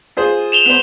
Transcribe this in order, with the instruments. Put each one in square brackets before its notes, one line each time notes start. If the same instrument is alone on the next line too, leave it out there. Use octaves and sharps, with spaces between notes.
[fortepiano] F4 G#4 C5
[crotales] E7 F7 G7
[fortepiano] B3 C5